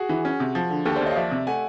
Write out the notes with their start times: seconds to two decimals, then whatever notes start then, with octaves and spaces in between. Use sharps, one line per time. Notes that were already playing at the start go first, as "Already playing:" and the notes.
Already playing: F#4 G#4
0.09 E3
0.25 C#4
0.40 C3
0.55 F3
0.70 D3
0.85 D#2 G4 A4
0.95 C5 D5
1.01 D#2
1.06 C#5 D#5
1.11 F5
1.16 F3 D5 E5
1.32 C3
1.47 A3 F#5 G#5